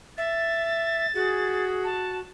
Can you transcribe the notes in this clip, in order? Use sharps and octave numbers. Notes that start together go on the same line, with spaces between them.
E5 A6
F#4 G#4
A5